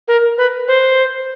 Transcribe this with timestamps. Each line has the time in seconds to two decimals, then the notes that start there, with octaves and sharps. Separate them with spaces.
0.08 A#4
0.38 B4
0.68 C5